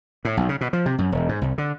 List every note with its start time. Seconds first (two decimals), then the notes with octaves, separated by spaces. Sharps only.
0.25 A2
0.37 B1
0.49 C#3
0.61 B2
0.73 F3
0.86 C3
0.98 F#2
1.12 E1
1.29 G#2
1.41 C2
1.58 D3